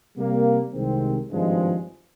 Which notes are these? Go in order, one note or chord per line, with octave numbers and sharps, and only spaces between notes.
C3 G3 A#3
C2 C3 D#3 G#3 C4
G#1 G2 F3 G#3